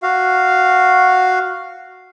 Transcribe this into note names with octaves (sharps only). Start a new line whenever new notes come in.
F#4 F5